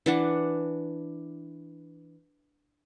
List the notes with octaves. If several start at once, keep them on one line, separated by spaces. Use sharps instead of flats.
E3 D4 F#5